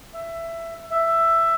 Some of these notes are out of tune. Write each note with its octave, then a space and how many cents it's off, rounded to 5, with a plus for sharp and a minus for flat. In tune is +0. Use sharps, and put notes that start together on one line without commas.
E5 +15
E5 +10